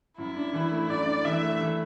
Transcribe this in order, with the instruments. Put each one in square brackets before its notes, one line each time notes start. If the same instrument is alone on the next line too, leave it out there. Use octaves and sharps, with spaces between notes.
[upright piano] F#2 [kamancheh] E4
[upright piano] D4
E3
A3
[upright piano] F#2 [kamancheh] D5
[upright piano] D4
[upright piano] E3 [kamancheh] E5
[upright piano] A3
E3